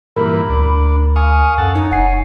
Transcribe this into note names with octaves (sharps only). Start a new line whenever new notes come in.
G2 A#2 E3 A#4 B5
D2 D4
F5 G#5 C#6 D#6
F#2 A4 F#5 A5
D#4 C#5
F1 F#5 G#5 C7